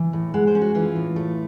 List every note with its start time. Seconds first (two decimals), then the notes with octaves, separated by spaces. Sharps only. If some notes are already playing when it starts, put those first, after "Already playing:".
Already playing: E3
0.13 A2
0.34 G#3 F#5
0.47 C5
0.55 C#4
0.61 F#4
0.75 E3 F4
0.96 A2
1.16 A3